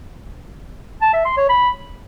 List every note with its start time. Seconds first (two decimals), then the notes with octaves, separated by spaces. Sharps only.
1.01 A5
1.13 E5
1.25 C6
1.37 C#5
1.49 B5